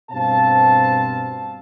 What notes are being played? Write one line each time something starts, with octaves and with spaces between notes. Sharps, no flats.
G2 B2 C4 C5 F5 A5